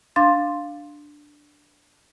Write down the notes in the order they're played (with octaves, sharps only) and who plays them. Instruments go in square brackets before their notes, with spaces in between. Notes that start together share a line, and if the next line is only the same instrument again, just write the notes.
[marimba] D4 F5 C6 A6